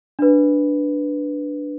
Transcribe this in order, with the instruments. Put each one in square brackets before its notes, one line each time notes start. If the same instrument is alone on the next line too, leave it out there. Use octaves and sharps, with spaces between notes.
[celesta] D4 B4